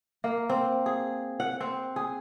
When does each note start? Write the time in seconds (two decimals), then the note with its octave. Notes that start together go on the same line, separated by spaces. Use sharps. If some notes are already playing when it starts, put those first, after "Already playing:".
0.24 A#3
0.50 C4
0.86 G#4
1.40 F#5
1.61 C4
1.96 G#4